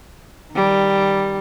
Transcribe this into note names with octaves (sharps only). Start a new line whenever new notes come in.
D#3 G3